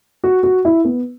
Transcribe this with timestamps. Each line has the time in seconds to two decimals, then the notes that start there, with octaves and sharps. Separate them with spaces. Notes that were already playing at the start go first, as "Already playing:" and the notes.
0.24 F#4
0.43 F#4
0.65 E4
0.84 B3